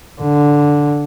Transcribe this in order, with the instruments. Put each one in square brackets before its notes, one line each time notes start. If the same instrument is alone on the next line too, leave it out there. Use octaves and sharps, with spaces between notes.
[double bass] D3